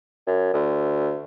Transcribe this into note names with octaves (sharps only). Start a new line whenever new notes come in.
F#2
D2